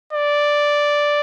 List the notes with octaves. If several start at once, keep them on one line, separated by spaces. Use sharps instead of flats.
D5